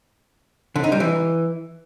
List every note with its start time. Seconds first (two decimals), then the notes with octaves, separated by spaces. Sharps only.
0.76 D3
0.84 D#4
0.92 G3
1.00 E3